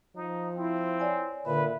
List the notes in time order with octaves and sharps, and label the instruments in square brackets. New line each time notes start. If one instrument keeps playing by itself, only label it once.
[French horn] F3 [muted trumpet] D#4
[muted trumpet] C4 [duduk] E4
[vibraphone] C#5 D5 G#5
[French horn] A#2 [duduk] D3 [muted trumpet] B4 [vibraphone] E5